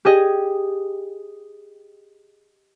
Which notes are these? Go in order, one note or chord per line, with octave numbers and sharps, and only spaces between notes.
G4 G#4 D#5